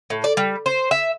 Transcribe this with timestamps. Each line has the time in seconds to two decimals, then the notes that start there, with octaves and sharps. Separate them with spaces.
0.10 A2
0.24 D5
0.37 G3
0.66 C5
0.91 E5